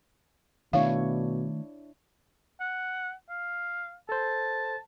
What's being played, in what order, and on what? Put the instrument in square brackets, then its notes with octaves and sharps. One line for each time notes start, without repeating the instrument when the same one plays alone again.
[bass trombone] B2 [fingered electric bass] D#3 A3 [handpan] D4 E4 C#5 [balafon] F5
[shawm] F#5
F5
[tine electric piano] A4 C5 [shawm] A5